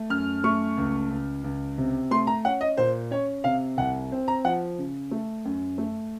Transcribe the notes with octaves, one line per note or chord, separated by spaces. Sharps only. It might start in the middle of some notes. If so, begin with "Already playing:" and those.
Already playing: A3
F#2 F6
A3 C#6
C#2
C#2
C#2
C3
A3 C6
A#5
C#4 F#5
D#5
A#2 C5
C#4 C#5
C3 F5
C2 F#5
C4
A#5
F3 F#5
C#3
A3
F#2
A3